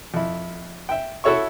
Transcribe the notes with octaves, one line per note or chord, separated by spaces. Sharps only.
F2 E4
E5 G5
E4 F#4 A4 C#5 E5 C#6